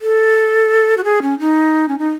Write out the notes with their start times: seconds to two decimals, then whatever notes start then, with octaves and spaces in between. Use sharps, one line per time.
0.01 A4
0.97 F#4
1.04 G#4
1.22 C#4
1.39 D#4
1.88 C#4
1.98 D#4